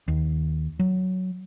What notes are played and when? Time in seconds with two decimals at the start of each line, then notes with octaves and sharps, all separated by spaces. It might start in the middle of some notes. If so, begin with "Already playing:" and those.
0.08 D#2
0.79 F#3